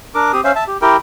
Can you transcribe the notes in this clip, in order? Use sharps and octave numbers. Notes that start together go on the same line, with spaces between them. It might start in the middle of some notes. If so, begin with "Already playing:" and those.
D4 A#4 D6
C4 G4 D#6
C#4 C5 E5 F5
E5 A5
G4
E4 G4 A#4 G5